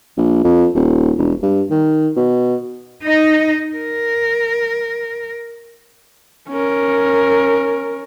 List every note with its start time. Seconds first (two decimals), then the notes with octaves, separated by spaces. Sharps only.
0.18 A#1
0.44 F2
0.75 D#1
1.18 E1
1.43 G2
1.71 D#3
2.17 B2
3.03 D#4 D#5
3.77 A#4
6.49 C#4 A#4